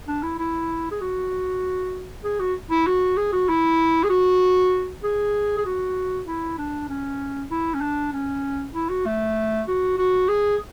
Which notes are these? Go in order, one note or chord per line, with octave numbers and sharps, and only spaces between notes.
D4
E4
E4
G#4
F#4
G#4
F#4
E4
F#4
G#4
F#4
E4
G#4
F#4
G#4
G#4
F#4
E4
D4
C#4
E4
C#4
D4
C#4
E4
F#4
A3
F#4
F#4
G#4